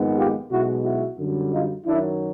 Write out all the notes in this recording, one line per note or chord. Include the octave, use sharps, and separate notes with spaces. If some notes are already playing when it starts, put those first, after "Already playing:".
Already playing: A#1 G#2 D#3 G#3 B3
F4 G4
B1 B2 G#3 E4 F#4
E4 F#4
F#2 D3 G3
D#4 F4
F#2 D#3 F#3 D4 E4